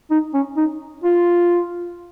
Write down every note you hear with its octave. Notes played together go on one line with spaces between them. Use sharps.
D#4
C#4
D#4
F4